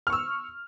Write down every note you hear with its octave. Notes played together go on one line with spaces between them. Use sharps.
C#6 E6 F6